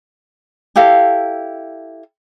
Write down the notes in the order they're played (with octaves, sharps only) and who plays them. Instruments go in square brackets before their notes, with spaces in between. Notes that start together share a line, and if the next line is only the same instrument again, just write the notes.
[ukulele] E4 G4 A4 F5